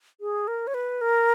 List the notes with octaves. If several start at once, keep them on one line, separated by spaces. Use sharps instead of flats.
G#4
A#4
C#5
B4
A#4